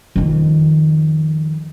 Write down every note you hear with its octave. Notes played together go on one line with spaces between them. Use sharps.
F2 D#3